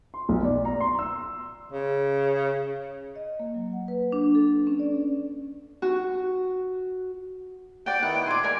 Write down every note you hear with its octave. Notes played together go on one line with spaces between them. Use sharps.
C6
B1
D5
A#5
C6
E6
C#3
D#5
A#3
F#3
F#5
B4
D4
A4
C#4
D5
F#4
D5 F#5 G5 D7
D#3 B3 E4 F#5
A#2 D5 G#5 C6 G#6
G3 G#3 A#4 G#5